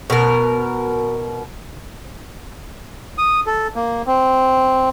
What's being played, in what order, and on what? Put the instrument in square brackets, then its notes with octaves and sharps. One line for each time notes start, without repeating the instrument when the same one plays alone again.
[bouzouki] B2 A#4
[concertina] D#6
A4
A#3
C4